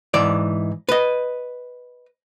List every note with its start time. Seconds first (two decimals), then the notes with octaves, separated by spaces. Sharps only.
0.14 G#2 E3 D5
0.89 B4 D#5